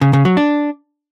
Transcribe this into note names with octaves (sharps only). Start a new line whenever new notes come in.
C#3
C#3
F#3
D4